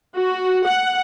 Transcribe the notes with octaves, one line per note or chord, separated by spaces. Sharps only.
F#4
F#5